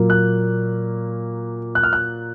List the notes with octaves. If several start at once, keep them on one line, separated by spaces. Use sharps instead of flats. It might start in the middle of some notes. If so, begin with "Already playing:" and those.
Already playing: A#2 F#3 A#3
F#6
F#6
F6
F#6